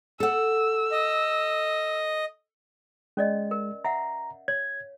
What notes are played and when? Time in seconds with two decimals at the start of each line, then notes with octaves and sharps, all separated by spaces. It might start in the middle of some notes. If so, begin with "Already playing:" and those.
0.20 A4 F#5 E6
0.91 D#5
3.17 G#3 C#4 D5 D#5
3.51 A#4
3.85 E5 F#5 A#5
4.48 C#5 G#6